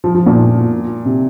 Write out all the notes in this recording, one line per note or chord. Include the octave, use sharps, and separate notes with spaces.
F3
F3
A#2
C3